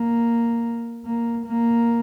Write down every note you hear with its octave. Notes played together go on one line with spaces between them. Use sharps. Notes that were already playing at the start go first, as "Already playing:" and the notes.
Already playing: A#3
A#3
A#3